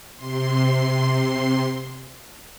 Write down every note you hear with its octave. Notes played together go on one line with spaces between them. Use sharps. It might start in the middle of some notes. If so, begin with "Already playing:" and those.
C3 C6